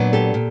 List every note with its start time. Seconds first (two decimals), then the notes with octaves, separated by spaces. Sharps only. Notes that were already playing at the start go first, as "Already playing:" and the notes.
Already playing: A#2 F#3 B3 D4
0.13 G4 A4
0.34 A#2